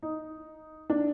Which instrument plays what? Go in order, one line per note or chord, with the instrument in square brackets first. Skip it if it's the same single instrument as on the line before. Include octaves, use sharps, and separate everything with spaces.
[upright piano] D#4
D4